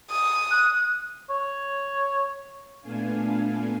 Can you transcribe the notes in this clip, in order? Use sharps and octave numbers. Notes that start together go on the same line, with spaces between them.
D#6
F#6
C#5
A#2 A3 B3 D4 F5 G#5